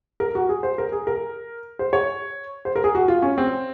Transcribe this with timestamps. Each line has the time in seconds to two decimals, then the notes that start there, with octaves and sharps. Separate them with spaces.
0.20 A#4
0.35 F#4
0.49 G#4
0.63 C5
0.78 A#4
0.92 G#4
1.07 A#4
1.79 C5
1.93 C#5
2.65 C5
2.76 A#4
2.84 G#4
2.95 F#4
3.08 F4
3.22 C#4
3.38 C4